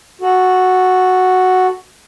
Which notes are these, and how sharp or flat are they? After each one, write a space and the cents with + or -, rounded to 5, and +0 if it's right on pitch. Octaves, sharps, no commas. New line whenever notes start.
F#4 +0 A4 +0